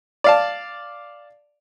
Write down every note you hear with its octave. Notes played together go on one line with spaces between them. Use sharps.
D5 F5 A5